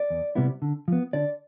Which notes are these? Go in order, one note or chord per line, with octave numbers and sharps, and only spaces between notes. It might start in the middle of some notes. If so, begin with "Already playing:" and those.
Already playing: D5
E2
C3 G3 B3 E4
D3
F3 B3
D3 D5